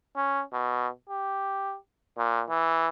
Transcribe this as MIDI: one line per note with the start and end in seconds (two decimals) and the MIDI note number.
0.17 0.42 61
0.53 0.88 47
1.10 1.76 67
2.18 2.43 46
2.50 2.88 52